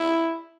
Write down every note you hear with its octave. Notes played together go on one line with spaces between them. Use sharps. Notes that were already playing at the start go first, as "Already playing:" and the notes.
Already playing: E4